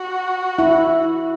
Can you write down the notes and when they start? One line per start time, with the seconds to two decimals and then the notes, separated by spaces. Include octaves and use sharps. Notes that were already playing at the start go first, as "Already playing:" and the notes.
Already playing: F#4
0.59 E4